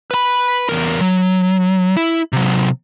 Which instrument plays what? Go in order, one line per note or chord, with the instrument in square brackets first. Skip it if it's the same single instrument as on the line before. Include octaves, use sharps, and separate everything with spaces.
[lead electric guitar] B4 B5
E2 A#4
F#3
E4
C3 F#3